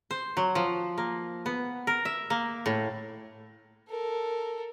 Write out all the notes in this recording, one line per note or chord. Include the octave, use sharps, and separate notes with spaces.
C5
F#3
F3
A#3
B3
A#4
E5
A#3
A2
A4 A#4